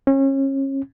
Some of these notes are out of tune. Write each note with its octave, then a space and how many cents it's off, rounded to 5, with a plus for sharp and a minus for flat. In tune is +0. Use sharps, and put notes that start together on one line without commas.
C#4 -30